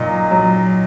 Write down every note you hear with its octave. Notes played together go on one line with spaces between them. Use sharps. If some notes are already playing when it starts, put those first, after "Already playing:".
Already playing: A#2 F#3 D#5
F#3